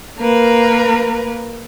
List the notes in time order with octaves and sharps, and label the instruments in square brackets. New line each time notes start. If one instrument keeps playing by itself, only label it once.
[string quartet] A#3 A#4 B4